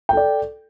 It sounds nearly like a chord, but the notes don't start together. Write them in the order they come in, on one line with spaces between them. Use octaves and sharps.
G5 A4 D5